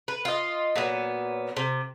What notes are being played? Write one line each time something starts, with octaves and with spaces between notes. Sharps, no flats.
B4
F4 D#5
A#2 F#3 B3
C3